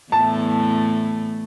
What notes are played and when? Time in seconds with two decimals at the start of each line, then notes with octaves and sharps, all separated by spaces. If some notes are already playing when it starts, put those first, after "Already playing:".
0.12 E2 A2 A3 A5